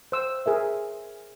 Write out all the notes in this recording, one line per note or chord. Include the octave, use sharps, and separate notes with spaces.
C5 E6
G#4 A#4 E5